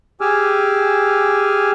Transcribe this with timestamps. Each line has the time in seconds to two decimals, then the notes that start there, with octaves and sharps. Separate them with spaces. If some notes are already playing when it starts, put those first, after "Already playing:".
0.21 G4 G#4 G#5 D6 E6 F6